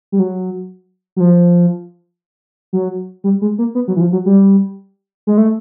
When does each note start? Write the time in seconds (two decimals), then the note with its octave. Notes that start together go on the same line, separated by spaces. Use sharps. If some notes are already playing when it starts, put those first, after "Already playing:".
0.12 G3
0.19 F#3
1.16 F#3
1.20 F3
2.73 F#3
3.24 G3
3.42 G#3
3.58 A#3
3.75 B3
3.88 F#3
3.96 E3
4.01 F3
4.12 F#3
4.26 G3
5.27 G#3
5.38 A3